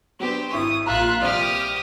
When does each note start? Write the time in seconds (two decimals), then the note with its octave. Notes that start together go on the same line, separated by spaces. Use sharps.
0.20 F#3 B3 D4 G4 C5
0.52 G#1 E4 C#6 D#6
0.86 A#1 F4 E5 A#5 F#6
1.21 C2 F3 G4 D5 D#6 F6